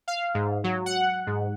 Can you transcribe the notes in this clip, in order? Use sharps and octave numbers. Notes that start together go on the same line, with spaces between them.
F5
G#2
F#3
F#5
G#2